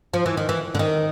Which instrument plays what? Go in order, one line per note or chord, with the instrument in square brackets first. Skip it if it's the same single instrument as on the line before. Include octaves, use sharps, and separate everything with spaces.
[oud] F3
E3
D#3
E3
D3
D#3